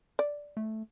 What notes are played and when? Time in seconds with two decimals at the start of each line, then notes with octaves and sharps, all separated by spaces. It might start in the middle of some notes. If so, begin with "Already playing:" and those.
0.19 D5
0.57 A3